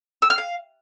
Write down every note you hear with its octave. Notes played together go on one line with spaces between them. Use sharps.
E6
F6
F5